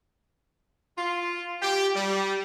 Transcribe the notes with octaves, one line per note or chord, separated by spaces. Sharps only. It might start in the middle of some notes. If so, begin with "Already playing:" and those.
F4
G4
G3